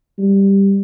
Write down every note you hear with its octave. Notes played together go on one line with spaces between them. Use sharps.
G3